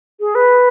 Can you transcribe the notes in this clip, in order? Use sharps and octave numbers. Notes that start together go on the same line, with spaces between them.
G#4
B4